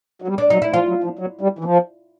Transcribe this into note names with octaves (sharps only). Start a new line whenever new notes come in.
F#3
G3
D4
F#3 D#4
E4
F3 F4
F#3
F3
F#3
G3
E3
F3